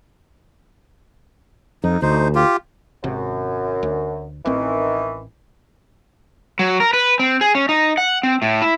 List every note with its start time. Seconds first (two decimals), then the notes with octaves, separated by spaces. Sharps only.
1.84 F2 D#4
2.02 D2 D#4 C5
2.35 F4 G4
3.04 G#1 F#2 C3
3.83 D2
4.46 A1 D#3 E3 C4
6.59 F#3
6.80 A#4
6.93 B4
7.19 C4
7.41 G#4
7.55 C#4
7.69 D#4
7.98 F#5
8.23 C4
8.42 A2
8.62 E4